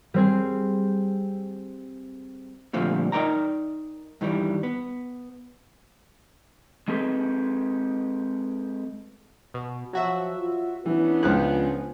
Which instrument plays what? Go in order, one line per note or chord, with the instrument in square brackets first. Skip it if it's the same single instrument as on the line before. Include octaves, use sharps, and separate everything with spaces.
[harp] G3 C4 G#4
[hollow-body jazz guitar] A#2 D3 F3 G3 A3 C4
D#4 A#4 D5 G5 A#5
G2 D#3 E3 G3
B3
[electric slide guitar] G#3 C4 G#4 A4 B4
[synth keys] B2
[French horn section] F3 [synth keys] F#3 F#4 E5
[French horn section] F4
[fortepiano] E3 [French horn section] B3 C#4 D4
[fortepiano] C#2 F#6 [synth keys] F3 G#4